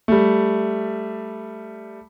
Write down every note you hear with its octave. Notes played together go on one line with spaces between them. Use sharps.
G3 A3